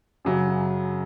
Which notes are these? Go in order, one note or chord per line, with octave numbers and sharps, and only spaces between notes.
F#2 C#3 F#3